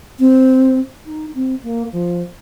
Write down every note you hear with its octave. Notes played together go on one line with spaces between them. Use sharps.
C4
D#4
C4
A#3
F3